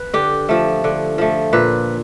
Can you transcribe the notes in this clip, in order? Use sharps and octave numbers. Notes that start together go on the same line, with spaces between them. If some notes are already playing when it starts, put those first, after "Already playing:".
Already playing: B4
D3 G4
F3 A3
D3
F3 A3
A#2 B4